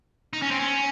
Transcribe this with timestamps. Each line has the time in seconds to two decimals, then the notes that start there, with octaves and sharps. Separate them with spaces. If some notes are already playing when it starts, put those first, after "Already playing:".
0.33 D#4
0.42 C#4
0.51 C4
0.59 C#4